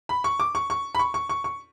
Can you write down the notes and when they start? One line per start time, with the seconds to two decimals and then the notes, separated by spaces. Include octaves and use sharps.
0.09 B5
0.24 C#6
0.40 D6
0.55 C#6
0.70 C#6
0.95 B5
0.99 C#6
1.14 C#6
1.29 C#6
1.44 C#6